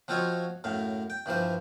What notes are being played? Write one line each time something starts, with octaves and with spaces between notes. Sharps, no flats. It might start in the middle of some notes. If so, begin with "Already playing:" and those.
F3 C4 F4 F#4 C#5 D#5
F#2 A2 F5
G5
G2 E3 F3 C5